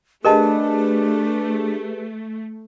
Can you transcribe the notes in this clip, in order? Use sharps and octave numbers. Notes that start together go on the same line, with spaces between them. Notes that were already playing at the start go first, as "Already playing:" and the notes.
A3 D4 G4 G#4 A#4 B4 D#5 A5